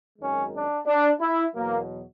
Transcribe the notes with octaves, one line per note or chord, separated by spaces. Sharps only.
G#1 F#2 D#3 G#3 C#4
D4
D4
E4
E2 B2 F#3 A#3